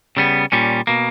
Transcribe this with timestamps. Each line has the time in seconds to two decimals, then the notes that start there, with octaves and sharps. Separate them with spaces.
0.17 C#3 G3 B3
0.52 A#2 G3 C#4
0.87 B2 A#3